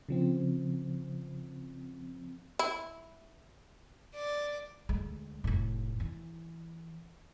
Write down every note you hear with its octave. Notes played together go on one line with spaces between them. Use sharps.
C#3 F3 C4
E4
D5
D2 G#3
F1 A2
E3